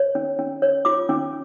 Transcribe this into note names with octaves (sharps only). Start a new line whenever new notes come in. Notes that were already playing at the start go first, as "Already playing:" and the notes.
Already playing: C#5
C#4
C#4
C#5
F4 D6
C#4